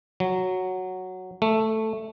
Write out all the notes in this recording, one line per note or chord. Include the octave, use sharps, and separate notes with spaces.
F#3
A3